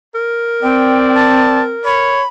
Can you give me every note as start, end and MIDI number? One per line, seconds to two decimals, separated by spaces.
0.15 2.23 70
0.63 1.75 60
0.63 1.61 74
0.63 1.12 79
1.15 1.61 81
1.85 2.23 73
1.85 2.28 83